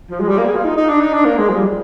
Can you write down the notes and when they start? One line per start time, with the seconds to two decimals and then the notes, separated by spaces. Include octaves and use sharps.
0.10 F3
0.20 G#3
0.28 G3
0.38 A#3
0.46 G#4
0.55 F4
0.64 D#4
0.77 D#4
0.89 D4
1.01 D#4
1.13 D4
1.25 A#3
1.37 G#3
1.50 F3
1.56 G3